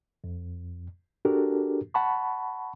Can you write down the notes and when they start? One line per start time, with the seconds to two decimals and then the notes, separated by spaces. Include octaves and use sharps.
0.24 F2
1.25 D4 F#4 G4 A4 A#4
1.94 F#5 A5 B5 C#6